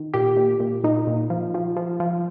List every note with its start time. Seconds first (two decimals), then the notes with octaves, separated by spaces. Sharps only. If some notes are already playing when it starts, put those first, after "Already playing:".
Already playing: D#3
0.14 A#2 G4
0.37 A#2
0.60 A#2
0.84 A#2 D#4
1.07 A#2
1.30 F3
1.54 F3
1.77 F3
2.00 F3